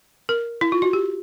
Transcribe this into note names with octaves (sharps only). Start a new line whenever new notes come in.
A#4
E4
F4
F#4
G4